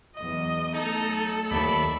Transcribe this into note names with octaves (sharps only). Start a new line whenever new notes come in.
E2 F#3 D#5
F#3 A3 D#4 A4
D#2 D5 E5 B5